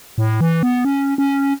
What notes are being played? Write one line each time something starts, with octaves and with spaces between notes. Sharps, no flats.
A2
E3
B3
C#4
C#4